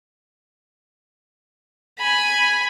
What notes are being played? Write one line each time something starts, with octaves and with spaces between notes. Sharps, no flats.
G#5 B5